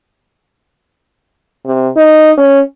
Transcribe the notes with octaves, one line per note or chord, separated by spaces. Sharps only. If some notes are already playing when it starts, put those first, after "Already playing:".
C3
D#4
C#4